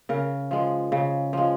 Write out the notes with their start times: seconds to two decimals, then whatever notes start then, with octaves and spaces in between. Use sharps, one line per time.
0.09 C#3 A#4
0.51 F3 G#3
0.92 C#3
1.33 F3 G#3